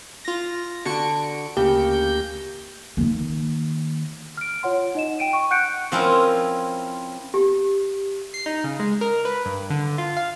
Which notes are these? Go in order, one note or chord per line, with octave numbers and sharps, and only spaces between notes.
F4 A#6
D3 F#4 C#6 C#7 D7
D2 C#3 A#3 G4 G6
D#3 A#3
F6 D7
F4 C#5 F#5 C6
D#4 D#5 E7
G5 D7 D#7
C#6
F#5 F#6 G6 C#7 D7
F3 C4 C#4 E4 A#4 D#5
G4
C7
D#4
C#3
G#3
A#4
B4
G2
D3
F4
F5